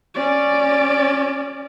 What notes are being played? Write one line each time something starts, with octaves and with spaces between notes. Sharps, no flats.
C#4 D5